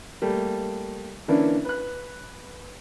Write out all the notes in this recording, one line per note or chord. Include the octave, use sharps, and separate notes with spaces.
G3 A3 A#3
D3 E3 A#3 C#4 D4 E4
B4 F#6